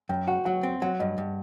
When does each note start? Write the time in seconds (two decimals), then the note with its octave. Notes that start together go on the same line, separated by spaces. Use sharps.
0.09 F#2 G5
0.27 F#4 F#5
0.45 F#3 F#5
0.63 C4
0.82 F#3 F#5
1.00 G2 D#5
1.18 G2